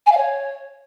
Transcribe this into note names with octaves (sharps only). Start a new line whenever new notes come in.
G#5
F5
C#5